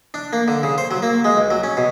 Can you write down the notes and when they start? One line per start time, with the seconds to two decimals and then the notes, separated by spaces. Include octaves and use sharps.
0.14 D4
0.33 A#3
0.48 D3
0.63 C#3
0.78 C5
0.91 F#3
1.02 A#3
1.24 G#3
1.37 C#2
1.51 F#3
1.63 C#4
1.77 B2